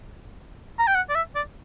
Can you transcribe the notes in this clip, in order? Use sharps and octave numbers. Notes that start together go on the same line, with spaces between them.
A#5
G5
F#5
D5
E5
D5